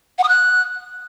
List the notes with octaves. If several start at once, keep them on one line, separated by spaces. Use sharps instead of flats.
F#5
D#6
F#6